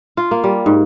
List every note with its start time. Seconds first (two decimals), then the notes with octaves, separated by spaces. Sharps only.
0.17 F4
0.31 A#3
0.44 G3
0.66 G#2